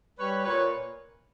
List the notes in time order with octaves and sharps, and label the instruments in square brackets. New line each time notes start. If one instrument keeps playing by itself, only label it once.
[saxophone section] G3 B4 C#5
A#2 B4 C#5